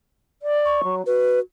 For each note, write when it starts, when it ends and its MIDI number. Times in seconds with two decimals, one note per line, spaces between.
0.42 0.81 74
0.65 0.95 85
0.84 1.06 54
1.06 1.41 66
1.06 1.39 71